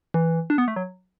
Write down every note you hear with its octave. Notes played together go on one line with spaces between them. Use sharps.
E3
D4
B3
A3
F#3